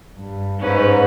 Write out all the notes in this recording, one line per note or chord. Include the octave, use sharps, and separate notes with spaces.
G2
G#2 C#4 B4